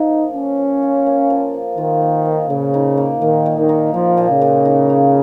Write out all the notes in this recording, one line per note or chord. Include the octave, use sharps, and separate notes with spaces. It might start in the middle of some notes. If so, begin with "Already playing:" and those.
Already playing: F3 D#4 F4
A#3
F3 C#4
F3
F4
A#3
F3
F3
D#3 F4
A#3
F3
A#2 C#3
D#4
A#3
A#2 D#3
A#2
D#3
D#4
F3 A#3
A#2
C#3
A#2
D#4
A#3